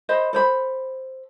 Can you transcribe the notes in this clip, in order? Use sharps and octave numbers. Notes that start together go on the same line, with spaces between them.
C5 D#5 B5
A4 C5 B5